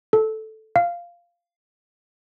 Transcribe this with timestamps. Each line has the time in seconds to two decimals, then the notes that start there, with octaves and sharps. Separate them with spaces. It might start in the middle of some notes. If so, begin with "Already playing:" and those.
0.13 A4
0.76 F5